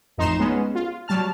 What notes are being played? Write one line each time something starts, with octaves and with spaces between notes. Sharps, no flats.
A1 F2 D#4 A#5 C6 E7
G#3 B3 C#4
F4
F#3 G3 A5 F6